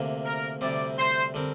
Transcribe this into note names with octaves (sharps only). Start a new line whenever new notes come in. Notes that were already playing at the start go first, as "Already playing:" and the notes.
Already playing: D2 C3 A#3
A#4
D2 C3 G3 C4 D5
C5
D3 G3 C4 A#4